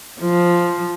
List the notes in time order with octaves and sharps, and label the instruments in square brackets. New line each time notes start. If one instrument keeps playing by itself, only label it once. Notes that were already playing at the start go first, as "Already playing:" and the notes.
[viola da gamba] F3